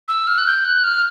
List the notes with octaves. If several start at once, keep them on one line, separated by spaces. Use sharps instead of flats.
E6
F6
F#6
G6
F#6
F6